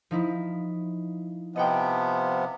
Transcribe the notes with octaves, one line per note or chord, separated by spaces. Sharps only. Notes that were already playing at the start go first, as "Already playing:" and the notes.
F3 D#4 E4
C3 F3 B3 D#5 F#5 G5